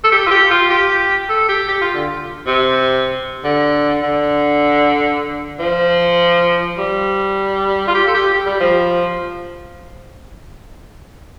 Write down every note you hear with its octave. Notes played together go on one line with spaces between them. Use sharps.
A4
G4
F4
G4
F4
G4
A4
G4
G4
F4
D3
C3
D3
D3
F3
G3
F4
G4
A4
G4
G4
G3
F3